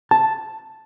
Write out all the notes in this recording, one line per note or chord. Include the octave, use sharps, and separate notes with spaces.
A5